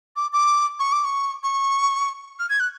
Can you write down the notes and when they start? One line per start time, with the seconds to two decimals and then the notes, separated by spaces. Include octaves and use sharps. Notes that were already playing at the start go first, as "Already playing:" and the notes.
0.16 D6
0.33 D6
0.79 C#6
0.92 D6
1.04 C#6
1.43 C#6
2.39 F6
2.49 G#6
2.60 F#6